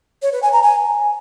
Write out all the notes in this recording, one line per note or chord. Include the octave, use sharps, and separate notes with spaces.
C#5
B4
G#5
A#5
G#5